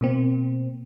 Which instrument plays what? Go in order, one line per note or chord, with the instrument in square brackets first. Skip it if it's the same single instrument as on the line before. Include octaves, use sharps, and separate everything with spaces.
[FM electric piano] B2 A#3 C4